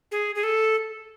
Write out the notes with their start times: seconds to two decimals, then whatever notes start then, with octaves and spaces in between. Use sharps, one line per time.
0.11 G#4
0.35 G#4
0.43 A4